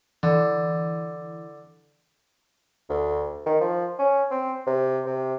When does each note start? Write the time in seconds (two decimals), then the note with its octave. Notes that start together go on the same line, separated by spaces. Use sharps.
0.23 D3 E3
2.89 D2
3.46 D#3
3.60 F3
3.99 C#4
4.31 C4
4.67 C3
5.06 C3